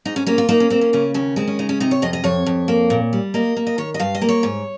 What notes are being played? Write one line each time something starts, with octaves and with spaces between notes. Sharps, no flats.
G#2 D#4
C#4
A#3 C#4
F4
A#3 D#4
C#4
A#3 C4
C#4
C#3 C#4
D#2 C#4
G#3 C4
C#4
C#3 D#4
C#4
C3 D#4
C#5
F2 D#5
D#5
F2 C#5
F2
A#3
A#2
G3
A#3 D#5
A#3
D#5
D#3 C#5
D#5
G2 F5
D#5
A#3
C#5
G#2